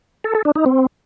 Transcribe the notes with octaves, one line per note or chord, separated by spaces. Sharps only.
A4
A4
D4
D#4
C4